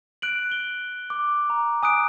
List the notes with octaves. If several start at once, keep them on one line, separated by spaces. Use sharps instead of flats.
F#6 D7 F#7
G7
D6
A#5
G#5 D#6 F#6 D7